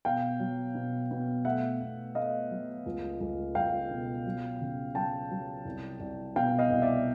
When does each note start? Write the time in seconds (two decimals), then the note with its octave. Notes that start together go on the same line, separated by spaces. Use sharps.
0.05 B2 F5 G5
0.40 F#3
0.75 B2
1.11 B2
1.45 A3 E5 F#5
1.81 B1
2.15 A3 D#5 F5
2.51 F#3
2.86 C#2
3.21 C#2
3.55 C#2 F5 G5
3.90 B2
4.26 F#3
4.61 C#3
4.95 F#3 G5 A5
5.31 F#3
5.65 C2
6.00 C2
6.36 B2 F5 G5
6.59 D#5 F5
6.71 C2
6.82 D5 E5